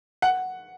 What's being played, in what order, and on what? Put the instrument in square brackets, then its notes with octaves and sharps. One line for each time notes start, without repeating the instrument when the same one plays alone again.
[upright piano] F#5